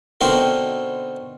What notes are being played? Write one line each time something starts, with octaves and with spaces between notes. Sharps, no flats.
B2 D3 C4 D#4 F#4 A#4